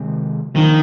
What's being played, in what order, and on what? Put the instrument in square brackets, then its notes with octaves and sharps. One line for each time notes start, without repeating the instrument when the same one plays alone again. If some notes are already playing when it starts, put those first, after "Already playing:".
Already playing: [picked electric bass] C3 D#3 G#3 C4
[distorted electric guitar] D#3 [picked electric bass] F3 A#3 D4